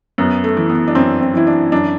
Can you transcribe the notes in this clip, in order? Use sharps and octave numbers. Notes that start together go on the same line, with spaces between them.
F#2 B3
A3
E3
B3
D4
F#2 C4
C4
E3 E4
D4
F#2 D4